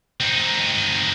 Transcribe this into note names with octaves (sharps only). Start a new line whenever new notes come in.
C4 D#4